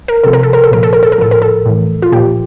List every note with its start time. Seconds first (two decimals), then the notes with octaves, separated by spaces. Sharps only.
0.08 A#4
0.24 C3 F3 A4
0.33 A#4
0.43 A4
0.53 A#4
0.64 A4
0.71 A#2 F3 A#4
0.83 A4
0.93 A#4
1.03 A4
1.12 A#4
1.18 A2 F3 A4
1.31 A#4
1.42 A4
1.66 A2 E3
2.02 F4
2.12 A#2 F3 G4